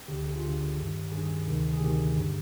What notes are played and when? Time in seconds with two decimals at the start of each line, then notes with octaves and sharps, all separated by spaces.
0.08 D2 D3 G4
0.26 G#4
0.36 F4
0.43 D2 D3 G4
0.77 G2 D#3
1.12 G2 D#3 G#4
1.46 D2 C3 D#3
1.73 G#4
1.81 D2 C3 D#3 G4
2.15 G2 D3